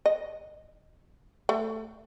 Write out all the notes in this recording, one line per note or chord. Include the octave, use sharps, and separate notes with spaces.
D#5
A3